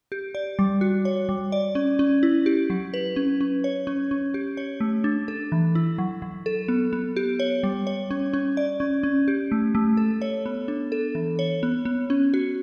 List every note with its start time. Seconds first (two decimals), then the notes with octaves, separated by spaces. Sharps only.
0.12 G4
0.35 D5
0.59 G3
0.81 F#4
1.05 C#5
1.29 G3
1.52 D5
1.75 C#4
1.99 C#4
2.23 E4
2.46 G4
2.70 F#3
2.94 B4
3.16 C#4
3.41 C#4
3.64 C#5
3.87 C#4
4.11 C#4
4.34 G4
4.57 C#5
4.80 A3
5.04 D4
5.28 A4
5.52 E3
5.75 E4
5.98 F#3
6.22 F#3
6.46 A4
6.68 B3
6.93 B3
7.16 G4
7.40 C#5
7.63 G3
7.87 C#5
8.11 C#4
8.33 C#4
8.57 D5
8.80 C#4
9.03 C#4
9.28 G4
9.52 A3
9.75 A3
9.97 A4
10.22 C#5
10.46 B3
10.68 D4
10.92 A4
11.15 E3
11.39 C#5
11.63 B3
11.85 B3
12.10 C#4
12.34 F#4